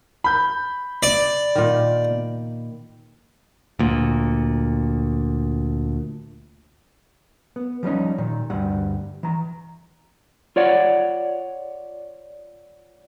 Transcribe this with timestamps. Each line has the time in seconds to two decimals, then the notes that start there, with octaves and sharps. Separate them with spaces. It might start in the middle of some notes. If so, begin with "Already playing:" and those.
0.24 B5 G6
1.03 D5
1.55 A#2 D#3
3.79 D2 A#2
7.56 B3
7.83 F3 G3 C#4 D#4
8.18 A#2 D#3
8.50 D2 G2 G3 F#5
9.23 E3 A#5
10.56 F4 C#5 D5 F#5